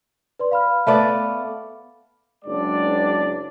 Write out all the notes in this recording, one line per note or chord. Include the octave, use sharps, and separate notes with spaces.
B4 D5 C6
F5 B5 F6
A3 B3 D5
F#1 G#3 D4 D5